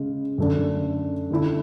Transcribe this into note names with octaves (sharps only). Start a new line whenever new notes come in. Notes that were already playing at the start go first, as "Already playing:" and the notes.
Already playing: C#3 G#3
F#2 D3 A3 D4
D3 A3 E4